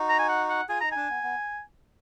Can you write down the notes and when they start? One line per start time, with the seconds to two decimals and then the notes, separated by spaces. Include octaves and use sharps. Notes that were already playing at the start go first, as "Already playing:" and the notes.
Already playing: D#4 F#4
0.09 A#5
0.19 G#5
0.29 F#5
0.49 F#5
0.69 F4 G#4 G#5
0.81 D#4 A#5
0.92 D4 G#5
1.10 B3
1.23 B3